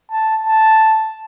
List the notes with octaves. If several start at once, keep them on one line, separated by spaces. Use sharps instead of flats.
A5
A5